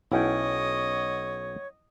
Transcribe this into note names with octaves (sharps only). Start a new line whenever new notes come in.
B1 C#4 E4 C#5 D#5 F#5 G5